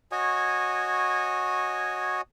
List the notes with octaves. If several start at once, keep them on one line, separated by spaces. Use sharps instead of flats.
F#4 C#5 D#5 G#5